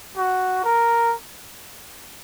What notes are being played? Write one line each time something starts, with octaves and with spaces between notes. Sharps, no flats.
F#4
A#4